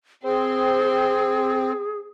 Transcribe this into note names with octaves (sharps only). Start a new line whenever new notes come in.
C4 G#4 C5